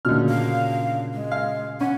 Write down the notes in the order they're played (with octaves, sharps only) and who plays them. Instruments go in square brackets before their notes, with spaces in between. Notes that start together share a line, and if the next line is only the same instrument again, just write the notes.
[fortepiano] D2 F6 [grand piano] A#2 C#3 F#4
[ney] F5
G#3
[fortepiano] F5
[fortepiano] C#4 [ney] F#5